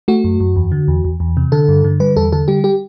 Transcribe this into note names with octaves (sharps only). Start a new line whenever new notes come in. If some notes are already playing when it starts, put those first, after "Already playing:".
A3 F#4
F#2
F#2
E2
D3
E2
E2
E2
C3
D3 A4
G2
D3
G3 B4
E2 A4
D3 A4
G3 G4
G4